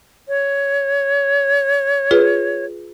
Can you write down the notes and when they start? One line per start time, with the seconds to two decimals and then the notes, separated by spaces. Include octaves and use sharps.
0.28 C#5
2.11 F4 G#4 B4